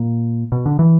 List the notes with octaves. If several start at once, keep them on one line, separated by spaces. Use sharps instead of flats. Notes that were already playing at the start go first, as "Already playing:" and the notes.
Already playing: A#2
B2
D3
E3